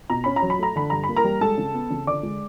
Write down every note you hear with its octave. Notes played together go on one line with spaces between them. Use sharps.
B2 A#5
C#4 B5
A#5
F#3
B5
A3 A#5
D3 B5
G2 A#5
B5
A#3
A#4 A#5
G3
G#3 A4 A5
C#3
B3
C#3
D3 D5 D6
G#3